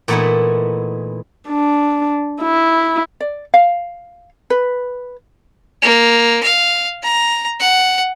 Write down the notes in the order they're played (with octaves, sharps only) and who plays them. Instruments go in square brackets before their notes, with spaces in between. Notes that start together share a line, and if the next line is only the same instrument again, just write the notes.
[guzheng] A#2 E3 A3 B3 D#4 E4
[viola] D4
E4
[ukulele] D5
F5
B4
[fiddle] A#3
F5
A#5
F#5